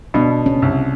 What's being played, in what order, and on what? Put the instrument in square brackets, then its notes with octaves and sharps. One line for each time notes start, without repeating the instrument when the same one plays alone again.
[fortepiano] B2 [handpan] D4
[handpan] C#4
[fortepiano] C2